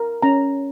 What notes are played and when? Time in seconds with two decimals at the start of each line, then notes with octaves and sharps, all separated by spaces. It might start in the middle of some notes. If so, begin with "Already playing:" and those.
Already playing: A#4
0.22 C#4 A#5